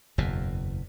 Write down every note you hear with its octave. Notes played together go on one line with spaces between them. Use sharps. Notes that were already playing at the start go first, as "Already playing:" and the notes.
F#1 E2 B2